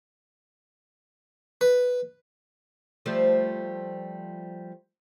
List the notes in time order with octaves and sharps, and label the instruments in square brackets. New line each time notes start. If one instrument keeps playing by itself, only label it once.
[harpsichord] B4
[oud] F3 G3 A3